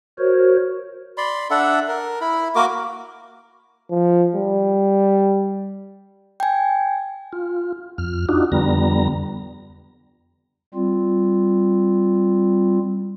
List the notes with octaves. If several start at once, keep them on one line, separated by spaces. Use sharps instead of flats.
F#4 A#4 C5 C#5
D5 B5 C6
D4 A4 E5 F#5
A#4
E4 B5
A#3 F#4 A#4 D6
F3
G3
G5 G#5
F4
F2 F6
D4 D#4 F4 F#4
F2 D3 G3 B3 A#5
G3 C4 F4